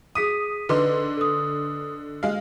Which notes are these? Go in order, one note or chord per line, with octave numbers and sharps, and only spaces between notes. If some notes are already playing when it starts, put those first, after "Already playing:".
G#4 D#6 B6 D#7
D3 D#4 B4 C6
A4 D#6
G#3 F5